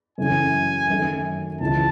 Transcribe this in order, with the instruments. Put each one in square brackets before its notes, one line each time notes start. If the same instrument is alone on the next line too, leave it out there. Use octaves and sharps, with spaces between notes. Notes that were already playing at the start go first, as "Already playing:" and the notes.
[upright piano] F#2 C#3 E3 A3 C#4 [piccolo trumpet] G#5
[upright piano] F#2 D#3 A3
[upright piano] C#2 C#3 E3 [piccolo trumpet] A5